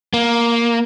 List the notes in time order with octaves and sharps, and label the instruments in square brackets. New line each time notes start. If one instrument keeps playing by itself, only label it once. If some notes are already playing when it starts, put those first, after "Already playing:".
[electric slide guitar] A#3